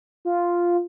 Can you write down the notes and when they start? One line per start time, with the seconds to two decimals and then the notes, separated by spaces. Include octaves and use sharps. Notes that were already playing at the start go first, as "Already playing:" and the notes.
0.25 F4